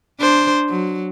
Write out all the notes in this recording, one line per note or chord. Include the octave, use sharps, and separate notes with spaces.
D4 C5
F#3